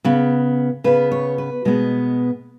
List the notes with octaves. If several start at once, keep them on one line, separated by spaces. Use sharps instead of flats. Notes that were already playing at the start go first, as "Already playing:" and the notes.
C#3 B3
C#3 B3 B4
C#5
B4
B2 G#3 B3